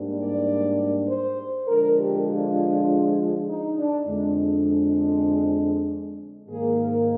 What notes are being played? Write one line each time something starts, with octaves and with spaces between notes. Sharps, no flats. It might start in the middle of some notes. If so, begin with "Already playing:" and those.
Already playing: G#2 G3 A#3 D4
D5
C5
D3 F3 G#3 D4 A#4
G4
F4
D#4
D4
F2 D3 G#3 D4
G#2 D#3 A#3 G#4
A#4